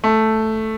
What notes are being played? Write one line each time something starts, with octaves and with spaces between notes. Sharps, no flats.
A3